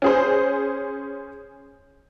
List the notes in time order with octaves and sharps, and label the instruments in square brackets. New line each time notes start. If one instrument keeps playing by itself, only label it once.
[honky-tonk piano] C#4 G#4 C5